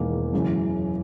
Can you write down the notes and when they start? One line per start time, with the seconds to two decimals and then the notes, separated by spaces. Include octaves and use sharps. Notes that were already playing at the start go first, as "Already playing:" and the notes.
Already playing: E1 E2 D#3 A#3
0.33 F#2 C#3 E3